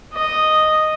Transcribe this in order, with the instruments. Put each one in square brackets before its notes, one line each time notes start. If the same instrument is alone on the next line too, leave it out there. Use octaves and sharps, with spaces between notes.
[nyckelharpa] D#5